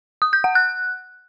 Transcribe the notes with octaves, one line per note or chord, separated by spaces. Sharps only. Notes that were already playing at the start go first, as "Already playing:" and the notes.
D#6
G6
F#5
F#6